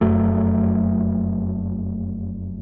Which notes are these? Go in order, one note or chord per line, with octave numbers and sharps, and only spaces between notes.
F1 F#2 F#3 A3